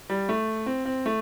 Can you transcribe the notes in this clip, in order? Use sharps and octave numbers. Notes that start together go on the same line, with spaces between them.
G3
A3
C4
C4
A3